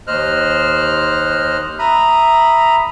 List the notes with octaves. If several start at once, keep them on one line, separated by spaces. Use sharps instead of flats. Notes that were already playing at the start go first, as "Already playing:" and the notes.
D#2 C5 D#5 F6 F#6
E5 A#5 B5 D#6